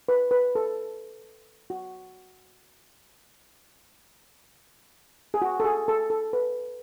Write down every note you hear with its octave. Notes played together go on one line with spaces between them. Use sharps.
B4
B4
A4
F#4
G#4
F#4
A4
G#4
A4
A4
B4